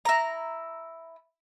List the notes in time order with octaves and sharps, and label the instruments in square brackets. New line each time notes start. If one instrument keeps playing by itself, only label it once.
[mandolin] E4 A#5